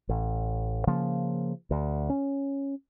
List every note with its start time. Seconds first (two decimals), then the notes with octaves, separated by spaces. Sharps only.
0.09 A1
0.87 C#3 F3 A#3
1.71 D2
2.10 C#4